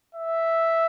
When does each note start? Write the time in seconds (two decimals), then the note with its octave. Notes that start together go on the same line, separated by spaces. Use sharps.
0.15 E5